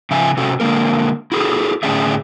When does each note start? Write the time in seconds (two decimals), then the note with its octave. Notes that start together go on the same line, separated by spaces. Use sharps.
0.11 C#3 F3 E5 G#5
0.37 C3 C#4 F#4 A4
0.60 D3 G#3 A#3 A#4
1.32 E4 F#4 G#4 A4
1.83 A2 D3 C#4 D4 G#4 E5